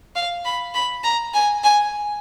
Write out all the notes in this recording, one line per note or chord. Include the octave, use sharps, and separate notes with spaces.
F5
B5
B5
A#5
G#5
G#5